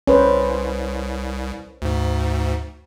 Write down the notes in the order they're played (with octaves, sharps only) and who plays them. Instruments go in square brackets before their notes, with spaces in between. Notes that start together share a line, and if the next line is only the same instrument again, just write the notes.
[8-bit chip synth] C2 [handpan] C#4 B4 C5
[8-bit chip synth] D2 G#2